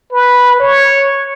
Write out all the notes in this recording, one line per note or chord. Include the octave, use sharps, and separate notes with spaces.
B4
C#5